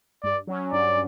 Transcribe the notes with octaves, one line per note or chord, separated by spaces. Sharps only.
G2 D5
F#3 C#4
G2 D5